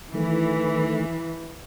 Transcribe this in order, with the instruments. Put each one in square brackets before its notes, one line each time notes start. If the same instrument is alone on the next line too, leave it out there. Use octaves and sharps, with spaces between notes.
[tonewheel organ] D#3 A3 [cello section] E3